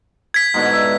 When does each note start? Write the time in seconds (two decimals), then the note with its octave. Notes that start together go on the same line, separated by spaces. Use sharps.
0.34 G#6 B6
0.54 G#2 B2 D3
0.73 E5